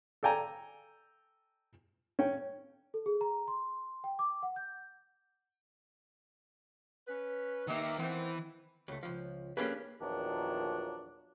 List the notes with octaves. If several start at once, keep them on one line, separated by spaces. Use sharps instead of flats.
A4 D5 G5 G#5 A#5
C#4 G5
A4
G#4
A#5
C6
G5
D6
F#5
G6
C#4 B4
D#3 A#3 D#4 G4 E5
D#3 E3 B3 C4
C#2 A3
C#2 F3
A#3 C#4 D4 G4 G#4 B4
E2 A#2 D#3 F3 F#3 D4